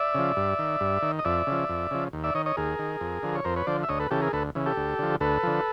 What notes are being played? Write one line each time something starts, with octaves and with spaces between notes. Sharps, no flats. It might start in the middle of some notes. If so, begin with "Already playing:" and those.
Already playing: D5 E5
C#3 F3
G2
D#3
G2
D#3
D#5
F2 D5 E5
C#3 F3
F2
C#3 F3
D#2
D5 E5
D#3 C#5 D#5
C#5 D#5
D#2 G#4 A#4
D#3
F2
D3 F3
C#5
F2 A#4 C5
B4 C#5
D3 F3 C5 D5
E5
D2 C#5 D#5
A4 B4
C#3 E3 G4 A4
G#4 A#4
D2 A4 B4
C#3 E3
G4 A4
D2
D3 F3
D2 A4 B4
D3 F3